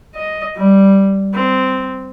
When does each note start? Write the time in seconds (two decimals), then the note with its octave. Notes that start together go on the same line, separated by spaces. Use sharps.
0.15 D#5
0.56 G3
1.34 C4